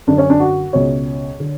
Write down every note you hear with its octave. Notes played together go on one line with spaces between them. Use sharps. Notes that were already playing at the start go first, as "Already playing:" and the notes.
F#2 D3 D4
C#4
D4
F#4
C#2 B2 C#5
D3